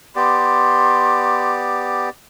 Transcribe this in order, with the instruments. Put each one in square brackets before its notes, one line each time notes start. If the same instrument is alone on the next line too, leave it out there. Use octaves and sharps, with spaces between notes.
[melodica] B3 G4 D5 [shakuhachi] C6